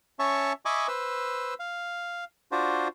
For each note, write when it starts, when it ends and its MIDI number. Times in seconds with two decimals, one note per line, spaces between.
0.19 0.53 61
0.19 0.53 73
0.19 0.53 76
0.19 0.53 81
0.19 0.53 85
0.65 0.87 75
0.65 0.87 76
0.65 0.87 80
0.65 0.87 83
0.65 0.87 85
0.65 0.87 86
0.88 1.54 71
0.88 1.54 72
0.88 1.54 88
1.59 2.24 77
2.52 2.88 62
2.52 2.88 65
2.52 2.88 66
2.52 2.88 72